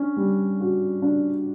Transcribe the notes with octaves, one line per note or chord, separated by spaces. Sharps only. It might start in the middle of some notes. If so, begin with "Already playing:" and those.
Already playing: C#4 D4
G3
F#4
D4